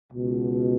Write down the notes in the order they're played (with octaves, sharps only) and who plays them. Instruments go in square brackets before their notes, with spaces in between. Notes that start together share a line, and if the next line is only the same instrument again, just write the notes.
[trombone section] C#2 B2